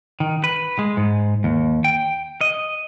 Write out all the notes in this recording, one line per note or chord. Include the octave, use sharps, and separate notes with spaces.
D#3
B4
G#3
G#2
D#2
G5
D#5